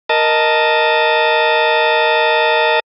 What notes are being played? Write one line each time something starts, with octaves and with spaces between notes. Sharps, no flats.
A#4 D#5 A5